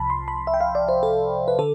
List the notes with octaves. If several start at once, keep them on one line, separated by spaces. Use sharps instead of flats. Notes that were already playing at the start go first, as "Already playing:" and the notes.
Already playing: C2 C3 F3 A5 B5
C6
B5
E5
G5
F5
D5
C5
A4
B4
D3 A4